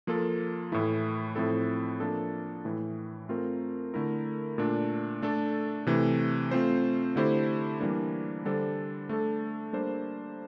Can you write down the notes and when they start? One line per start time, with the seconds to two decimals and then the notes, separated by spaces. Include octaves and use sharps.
0.07 F3 A#3 F4 A4
0.72 A2 E3 A3 E4
1.36 A2 F3 C4 E4 A4
2.00 F3 A#3 D4 A4
2.65 A2 E3 A3
3.29 A3 C4 F4 A#4
3.94 D3 A3 E4 A#4
4.58 A#2 A3 D4
5.22 A3 D4 A4
5.87 C3 E3 A3
6.51 A3 C4 F4 C5
7.16 D3 A3 E4 G4 C5
7.80 E3 G3 A#3 D4
8.45 D3 G3 D4 A4 C5
9.09 A3 D4 A4
9.73 G3 A#3 D4 A4 C5